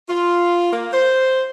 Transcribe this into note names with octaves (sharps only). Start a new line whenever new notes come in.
F4
A#3
C5